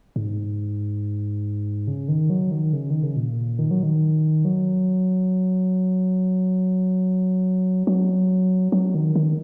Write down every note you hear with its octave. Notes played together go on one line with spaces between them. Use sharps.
G#2
C#3
D#3
F#3
D#3
C#3
D#3
C#3
A#2
D#3
F#3
D#3
F#3
F#3
F#3
D#3
D#3